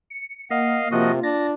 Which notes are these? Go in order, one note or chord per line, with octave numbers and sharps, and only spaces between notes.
C#7
A#3 D#5 F5 F#5
C3 F3 F4 F#4 D#5
D4 A6 A#6